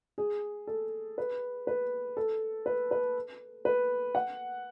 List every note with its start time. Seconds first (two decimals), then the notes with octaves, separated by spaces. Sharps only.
0.18 G#4
0.67 A4
1.18 B4
1.67 B4
2.17 A4
2.66 B4
2.91 B4
3.65 B4
4.15 F#5